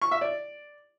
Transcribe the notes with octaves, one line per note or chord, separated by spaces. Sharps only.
C#6
E5
D5